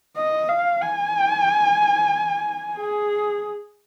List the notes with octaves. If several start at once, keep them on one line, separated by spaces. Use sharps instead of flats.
D#5
F5
G#5
G#4